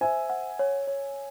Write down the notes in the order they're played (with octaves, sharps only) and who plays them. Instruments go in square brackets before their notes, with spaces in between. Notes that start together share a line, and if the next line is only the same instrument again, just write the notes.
[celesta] C5 [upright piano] E5 G#5
[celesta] F#5
C#5
C#5